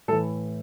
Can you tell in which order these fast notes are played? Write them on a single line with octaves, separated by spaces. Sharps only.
A2 A4 E3